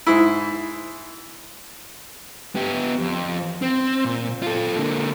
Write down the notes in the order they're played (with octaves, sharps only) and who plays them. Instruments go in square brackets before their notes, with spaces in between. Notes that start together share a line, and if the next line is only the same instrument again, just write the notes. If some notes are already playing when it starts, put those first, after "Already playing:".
[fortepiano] G#2 E4
[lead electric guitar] B3 G4
F2
C4
A#2
F4 A4
D3 A#3